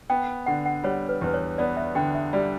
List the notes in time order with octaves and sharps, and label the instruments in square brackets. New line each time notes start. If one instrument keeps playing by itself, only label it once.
[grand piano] B3 [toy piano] G5
[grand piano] D3 [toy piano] F#5
[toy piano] F#5
[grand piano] G3 [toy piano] C#5
[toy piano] B4
[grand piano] E2
[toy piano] B4
C#5
[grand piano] B3 [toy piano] D5
[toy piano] E5
[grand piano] D3 [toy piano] G5
[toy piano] E5
[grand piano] G3 [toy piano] D5